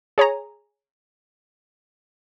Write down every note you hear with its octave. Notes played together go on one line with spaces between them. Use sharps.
G#4 C#5 G#5 A#5